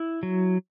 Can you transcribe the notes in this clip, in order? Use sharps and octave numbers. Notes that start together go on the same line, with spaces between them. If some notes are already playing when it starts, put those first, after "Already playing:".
Already playing: E4
F#3